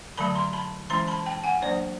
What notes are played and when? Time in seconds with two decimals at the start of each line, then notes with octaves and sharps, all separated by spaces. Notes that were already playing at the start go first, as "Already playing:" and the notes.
0.18 D3 F#3 A3 A5 B5
0.35 A#5 C6
0.53 A5 B5
0.90 E3 G#3 C#4 E4 A#5 C6
1.08 A5 B5
1.26 G5 A5
1.44 F#5 G#5
1.62 F#3 A#3 D4 C5 D5